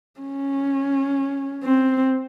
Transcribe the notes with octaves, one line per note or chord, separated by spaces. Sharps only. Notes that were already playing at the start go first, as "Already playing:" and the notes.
C#4
C4